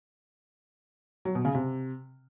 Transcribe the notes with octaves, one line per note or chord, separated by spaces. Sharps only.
F#3
B2
C#3
C3